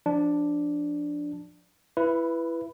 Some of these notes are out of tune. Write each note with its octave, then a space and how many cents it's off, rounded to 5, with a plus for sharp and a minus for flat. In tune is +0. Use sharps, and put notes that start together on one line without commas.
F3 +20 D4 +0
E4 +20 B4 +0